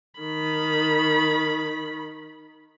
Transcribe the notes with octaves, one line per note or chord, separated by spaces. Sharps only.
D#3 B5